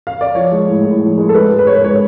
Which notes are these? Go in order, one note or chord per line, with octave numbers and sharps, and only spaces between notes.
F5
D5
F3 C#5
G#3
A2
A2
F3
G#3
A4
G#3 B4
G#2
B4
G#2 C#5
B4
G#3 C#5